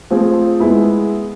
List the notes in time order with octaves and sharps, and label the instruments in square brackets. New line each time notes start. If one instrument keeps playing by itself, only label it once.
[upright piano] F3 A3 C4 F4 G#4
G#3 B3 E4